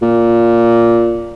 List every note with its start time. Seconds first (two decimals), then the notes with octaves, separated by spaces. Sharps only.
0.02 A#2